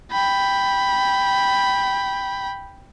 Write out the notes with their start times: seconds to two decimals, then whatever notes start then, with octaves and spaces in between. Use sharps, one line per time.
0.12 G5 B5